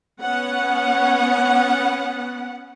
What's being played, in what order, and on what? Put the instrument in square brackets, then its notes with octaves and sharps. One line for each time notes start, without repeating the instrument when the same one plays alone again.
[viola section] B3 C#4 F#5